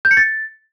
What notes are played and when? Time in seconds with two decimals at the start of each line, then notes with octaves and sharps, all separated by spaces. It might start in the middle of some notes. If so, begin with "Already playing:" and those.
0.05 G6
0.11 C#7
0.17 A6